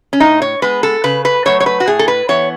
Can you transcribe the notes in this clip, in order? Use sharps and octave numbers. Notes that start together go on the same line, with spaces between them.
C#4
A2 D#4
C#5
G#3 B3 B4
A4
C#3 B4
B4
F#3 A3 C#5
C#5
B4
F#4
A2 G#4
A4
B4
E3 B3 C#5